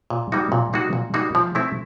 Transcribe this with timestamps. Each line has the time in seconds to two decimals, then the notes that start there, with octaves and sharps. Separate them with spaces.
0.10 A#2
0.32 G3 A#3 D#4 F#4
0.52 A#2
0.73 G3 A#3 D#4 F#4
0.93 A#2
1.14 G3 A#3 D#4 F#4
1.35 F3
1.55 A3 C4 E4